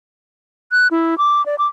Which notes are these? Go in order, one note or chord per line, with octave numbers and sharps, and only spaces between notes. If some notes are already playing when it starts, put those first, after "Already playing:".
F#6
E4
D6
D5
D6